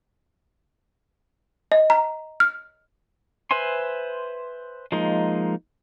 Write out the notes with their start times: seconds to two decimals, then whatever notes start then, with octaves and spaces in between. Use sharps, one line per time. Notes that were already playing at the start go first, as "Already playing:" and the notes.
1.72 D#5
1.90 A#5
2.40 F6
3.51 B4 C5 E5 G#5 C6
4.92 F3 G#3 A#3 D#4